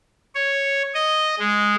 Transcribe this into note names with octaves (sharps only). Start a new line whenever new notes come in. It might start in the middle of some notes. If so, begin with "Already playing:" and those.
C#5
D#5
G#3